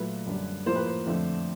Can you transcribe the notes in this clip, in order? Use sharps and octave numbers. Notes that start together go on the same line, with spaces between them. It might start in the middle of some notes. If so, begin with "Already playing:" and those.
Already playing: A#2 F#3 A3 B4
F#2 D3 G3
A2 F3 A#3 C5
B4
C5
F2 D3 F3 A3